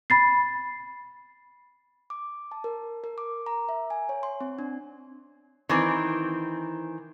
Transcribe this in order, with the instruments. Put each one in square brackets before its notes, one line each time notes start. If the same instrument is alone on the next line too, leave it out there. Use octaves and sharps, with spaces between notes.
[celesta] B5 A6 C7
[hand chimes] D6
A5
A#4
A#4
D6
A#5
E5
G#5
C#5
C6
C4
D4
[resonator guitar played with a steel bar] D#3 E3 C4